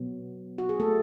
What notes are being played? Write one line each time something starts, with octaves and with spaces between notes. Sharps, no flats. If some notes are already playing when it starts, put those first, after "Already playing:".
Already playing: B2 F#3 B3
F#4
G#4
A3 A4